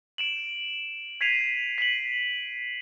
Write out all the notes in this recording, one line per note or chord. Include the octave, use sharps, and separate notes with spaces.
D7 E7 F#7
G#6 B6 C7 D#7 F7
B6 D7 D#7 F#7